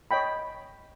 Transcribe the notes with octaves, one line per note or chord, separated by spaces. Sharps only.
C#5 D#5 G5 B5